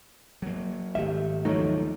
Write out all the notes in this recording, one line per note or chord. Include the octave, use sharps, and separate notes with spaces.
F#3 A#3
G#1 A3 G4 E5
D#2 A#2 F3 F#3 A3 D#4